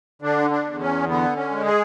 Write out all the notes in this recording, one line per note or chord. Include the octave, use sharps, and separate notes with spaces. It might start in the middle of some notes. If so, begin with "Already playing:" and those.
D3 D4
D4
E2
C#4
D3 B3
C#4
G#3
G#4